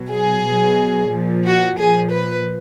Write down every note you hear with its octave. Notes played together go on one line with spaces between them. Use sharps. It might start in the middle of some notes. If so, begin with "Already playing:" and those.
Already playing: B2 F#3
G#4
B2 F#3
A#2 F3
F#4
A#2 F3 G#4
B4